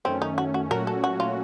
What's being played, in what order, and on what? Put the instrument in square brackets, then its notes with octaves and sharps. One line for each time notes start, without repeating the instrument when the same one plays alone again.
[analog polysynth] F#2 D#3 A3 C#4 [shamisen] C4
[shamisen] D#4
F#4
F#4
[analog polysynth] A#2 F#3 A3 C#4 F#4 [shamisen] A#4
[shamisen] A4
F#4
F4